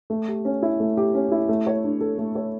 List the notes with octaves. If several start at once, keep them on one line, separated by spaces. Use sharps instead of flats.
A3
G4
C#4
E4
A3
G4
C#4
E4
A3
C#5
D4
A4
A3
C#5